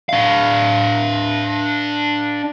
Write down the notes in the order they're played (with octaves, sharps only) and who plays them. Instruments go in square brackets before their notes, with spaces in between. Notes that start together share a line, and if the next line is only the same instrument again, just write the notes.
[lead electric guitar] D4 F5